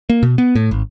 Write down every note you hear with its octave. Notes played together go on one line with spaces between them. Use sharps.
A#3
B2
B3
A2
G#1